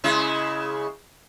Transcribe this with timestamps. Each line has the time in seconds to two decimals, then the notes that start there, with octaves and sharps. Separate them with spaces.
0.04 C#3 G#3 E4